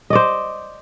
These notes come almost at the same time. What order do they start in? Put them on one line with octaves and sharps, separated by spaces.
D#5 D5 C5